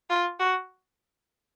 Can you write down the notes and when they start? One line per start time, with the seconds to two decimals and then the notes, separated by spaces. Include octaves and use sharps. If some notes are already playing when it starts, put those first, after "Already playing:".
0.10 F4
0.40 F#4